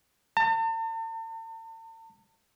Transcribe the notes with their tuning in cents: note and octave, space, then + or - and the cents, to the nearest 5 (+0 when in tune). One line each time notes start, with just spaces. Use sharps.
A5 +45